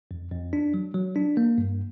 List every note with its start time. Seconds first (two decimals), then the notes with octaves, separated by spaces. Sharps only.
0.11 F2
0.32 F2
0.53 D4
0.74 F#3
0.94 F#3
1.16 D4
1.37 A#3
1.58 G2